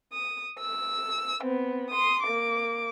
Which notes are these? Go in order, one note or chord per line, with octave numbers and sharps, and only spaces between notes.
D#6
E6
B3 C4
C6 D#6
A#3 D6